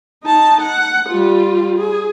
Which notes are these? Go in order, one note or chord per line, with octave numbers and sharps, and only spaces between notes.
D#4 A5
F#5
G3 F4
G#4